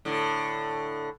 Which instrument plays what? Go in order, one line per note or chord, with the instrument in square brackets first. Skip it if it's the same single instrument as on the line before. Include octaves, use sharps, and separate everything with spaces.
[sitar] A2 D3